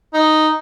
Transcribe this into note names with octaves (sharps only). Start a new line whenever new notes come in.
D#4